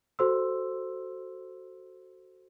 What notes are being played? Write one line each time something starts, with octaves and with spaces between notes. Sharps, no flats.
F#4 A4 C5 C6 E6